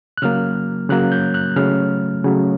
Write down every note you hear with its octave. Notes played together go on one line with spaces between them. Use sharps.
F#6
C#3 F#3 A#3 F6
C#3 F#3 A#3 F#6
G6
F#6
C#3 F#3 A3 F6
C#3 F#3 A3